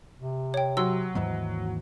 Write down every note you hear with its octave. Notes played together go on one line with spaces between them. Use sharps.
C3
C#5 G5
F#3 C6 E6
D#2 G#2 E3